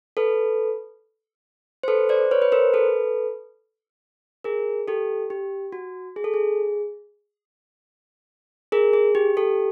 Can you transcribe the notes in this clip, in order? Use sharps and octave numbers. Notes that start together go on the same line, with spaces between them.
A4 B4
C5
A4 B4
C5 D5
B4 C#5
B4
A#4 C5
A4 B4
G#4 A#4
G4 A4
G4
F#4
G#4
A4
G#4
G#4 A#4
G#4
G4
G4 A4